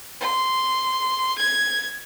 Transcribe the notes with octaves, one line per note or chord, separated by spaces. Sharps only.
C6
G#6